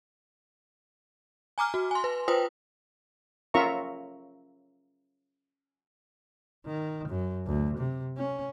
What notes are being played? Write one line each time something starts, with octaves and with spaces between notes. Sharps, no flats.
G#5 A#5 D6 F6
F#4
G#5 C6
B4
F4 B4 C5 G5 D#6
C#4 F4 A#4 E5 A#5 C#6
D#3
F#2
D2
C3
C#4